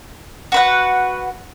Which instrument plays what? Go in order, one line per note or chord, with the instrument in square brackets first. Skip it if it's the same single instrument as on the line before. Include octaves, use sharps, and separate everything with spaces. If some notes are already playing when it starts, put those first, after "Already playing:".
[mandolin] F#4 B4 F#5